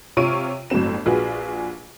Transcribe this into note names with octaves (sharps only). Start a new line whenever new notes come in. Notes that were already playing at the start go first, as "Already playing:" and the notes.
C3 F4 C#5 C#6 D7 D#7
G1 A2 F#3 C4 E7
A#1 F4 F#4 G#4 B4